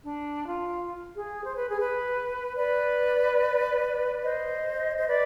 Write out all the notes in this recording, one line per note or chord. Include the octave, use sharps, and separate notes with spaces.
D4
F4
G#4
C5
B4
G#4
B4
B4 D5
C5 D#5
C5
B4 D5